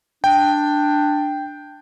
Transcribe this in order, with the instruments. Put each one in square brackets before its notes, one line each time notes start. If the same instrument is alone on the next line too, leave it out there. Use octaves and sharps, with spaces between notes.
[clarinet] D4 [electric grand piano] G5